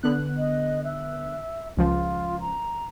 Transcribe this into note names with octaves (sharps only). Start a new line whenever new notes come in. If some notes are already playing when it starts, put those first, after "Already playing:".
D3 B3 F#6
D#5
E5
C#2 F3 F4
A#5